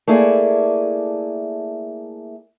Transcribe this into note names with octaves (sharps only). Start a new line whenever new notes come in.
A3 A#3 E4 G#4 D5